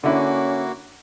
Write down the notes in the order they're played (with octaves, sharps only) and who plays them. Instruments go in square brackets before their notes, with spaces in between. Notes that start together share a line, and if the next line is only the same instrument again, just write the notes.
[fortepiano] D3 E4 [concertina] A#3 F#4 [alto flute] C#4